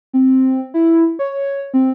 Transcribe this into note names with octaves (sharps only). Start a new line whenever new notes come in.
C4
E4
C#5
C4